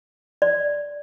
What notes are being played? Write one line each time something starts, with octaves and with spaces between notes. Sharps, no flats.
D5